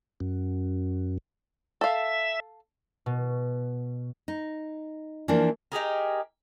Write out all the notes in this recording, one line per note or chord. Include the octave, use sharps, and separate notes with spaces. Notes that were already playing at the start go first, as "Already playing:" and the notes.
F#2
A4 E5 F5
B2
D#4
E3 F3 A#3 D4
D#4 G4 G#4 A#4